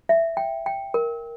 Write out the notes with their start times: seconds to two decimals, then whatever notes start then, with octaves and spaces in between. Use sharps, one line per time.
0.09 E5
0.37 G5
0.66 G5
0.94 A#4